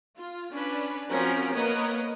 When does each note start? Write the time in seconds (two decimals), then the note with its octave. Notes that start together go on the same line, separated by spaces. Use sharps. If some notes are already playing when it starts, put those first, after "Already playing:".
0.16 F4
0.51 C#4 D4 B4 B5
1.09 F3 C4 C#4 F#4 A#4
1.53 A#3 B3 A#4 B4 C#5 D#5